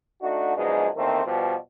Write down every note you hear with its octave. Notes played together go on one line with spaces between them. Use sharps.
A3 D4 D#4 F#4
F#2 B2 F3 G#3 D4 D#4
E2 D#3 A3 A#3 C4
B2 F3 G3